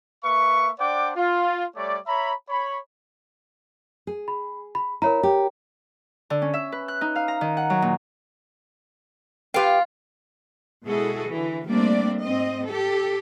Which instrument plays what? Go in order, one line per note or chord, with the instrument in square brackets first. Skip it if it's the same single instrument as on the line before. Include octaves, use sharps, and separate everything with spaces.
[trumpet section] A#3 B4 E5 C#6
D4 C5 D5 F#5 G5 D6
F4
G3 A3 C#5 D5
C#5 E5 A#5 B5
C#5 B5
[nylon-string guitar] G#4
[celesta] B5
B5
[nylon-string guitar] E4 [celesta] A#4 C#5 A#5
[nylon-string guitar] G4
[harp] D3
C#4
E5
B4
F#6
D#4
F5
A#5
D#3
F#5
F#3
A#2
[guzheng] F4 F5 [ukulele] G4 B4 G5
[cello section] B2 G#3 E4 F#4 G#4 A4
D3 E3
G3 A3 A#3 C4 D4 D5
G#2 C4 D#5
G4 A4